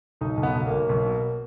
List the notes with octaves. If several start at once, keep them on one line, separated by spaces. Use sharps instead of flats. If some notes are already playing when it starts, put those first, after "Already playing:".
B1 D#4
B1
B3
B1
B1 A#3
B1
B2